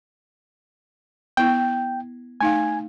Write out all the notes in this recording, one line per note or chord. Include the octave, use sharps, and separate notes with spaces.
B3 E4 G5
A3 D#4 F5 G#5